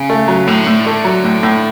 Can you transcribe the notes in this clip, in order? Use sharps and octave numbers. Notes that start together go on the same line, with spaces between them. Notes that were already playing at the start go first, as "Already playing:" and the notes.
Already playing: C#3
A3
F#3
A2 D3
A2
A3
F#3
A2
A2